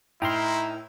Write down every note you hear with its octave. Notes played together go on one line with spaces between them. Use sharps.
A2 D#4 E4 A#4 G5 A#5 C6